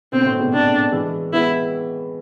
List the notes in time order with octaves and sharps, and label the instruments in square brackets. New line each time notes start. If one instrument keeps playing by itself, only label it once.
[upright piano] B2 D3 [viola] C4
[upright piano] A2 C3
G#2 B2
[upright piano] A2 C3 [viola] D4
[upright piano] E3 G#3
[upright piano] G#3 B3 [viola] E4